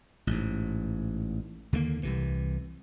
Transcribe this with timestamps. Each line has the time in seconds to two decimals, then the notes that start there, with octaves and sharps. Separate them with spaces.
0.27 A1 G#2
1.73 D#2 D3 E3 A#3
2.03 C2 C3 E3